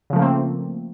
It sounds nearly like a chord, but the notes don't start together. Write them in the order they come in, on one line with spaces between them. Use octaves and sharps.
C#3 F3 A3 A#3 C4